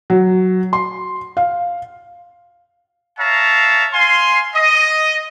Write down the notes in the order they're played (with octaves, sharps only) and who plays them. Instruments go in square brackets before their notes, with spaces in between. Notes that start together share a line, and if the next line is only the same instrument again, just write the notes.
[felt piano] F#3
C6
F5
[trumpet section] C#5 E5 F5 A5 A#5
F5 G#5 C6
D#5